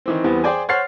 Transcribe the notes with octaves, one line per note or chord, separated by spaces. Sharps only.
D#3 E3 C4
E2 E3 G3 B3 C4
G#4 C5 D5 G5 G#5
C5 C#5 F#5 F6 A6 C7